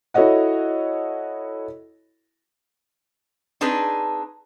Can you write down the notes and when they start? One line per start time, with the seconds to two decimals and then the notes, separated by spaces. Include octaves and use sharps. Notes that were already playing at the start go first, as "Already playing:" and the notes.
0.14 E4 F#4 A4 C#5 D#5 F#5
3.61 C4 D4 D#4 G#4 B4